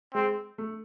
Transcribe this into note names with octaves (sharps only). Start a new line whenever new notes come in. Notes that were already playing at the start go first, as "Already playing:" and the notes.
G#3 C4
A3